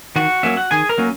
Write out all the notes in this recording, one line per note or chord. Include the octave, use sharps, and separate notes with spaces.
D#3 F#4 F#5
F#3 A#3 C#4 E5
F#5
D#3 G#4 G#5
A#4 A#5
F#3 A#3 C#4